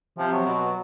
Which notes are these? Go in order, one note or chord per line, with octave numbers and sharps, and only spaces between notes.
C3 F3
F#3
B2